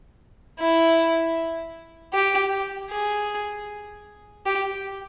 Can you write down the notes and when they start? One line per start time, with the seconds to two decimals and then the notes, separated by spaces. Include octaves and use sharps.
0.60 E4
2.13 G4
2.91 G#4
4.45 G4